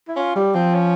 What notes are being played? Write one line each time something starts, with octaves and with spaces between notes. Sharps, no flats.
E4
C#4 F4
G3
F3 C4
C#4